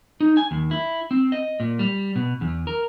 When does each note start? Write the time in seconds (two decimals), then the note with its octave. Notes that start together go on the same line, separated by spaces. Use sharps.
0.21 D#4
0.37 G#5
0.51 D#2
0.71 E4
1.11 C4
1.32 D#5
1.60 A#2
1.79 G3
2.16 B2
2.41 E2
2.67 A#4